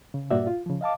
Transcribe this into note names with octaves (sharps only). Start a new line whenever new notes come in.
C#3
G2 A#2 A#3 F#4 D5 E5
F4
C#3 F3
D#5 F5 A5 D6